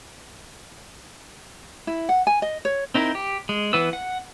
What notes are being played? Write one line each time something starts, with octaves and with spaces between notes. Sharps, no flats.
E4
F#5
G#5
D#5
C#5
C4 D#4 E4 A#4
G4
G#3
E3 B3 B4 E6
F#5